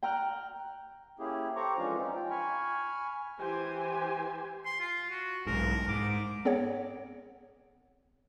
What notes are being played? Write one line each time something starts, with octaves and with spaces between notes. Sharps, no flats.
G5 A#5 F6 F#6
A#3 C#4 E4 G4 G#4
G4 A4 C5 A#5 C#6 D6
E3 F3 G#3 C#4 D4 F4
C4 C#4 D#4
F4 G5
G#5 B5 C#6 F6
E3 G4 C5 G#5
C6
F4
F#4
B1 G#2 A#4
G#2 D6
B3 C4 G#4 C#5 F#5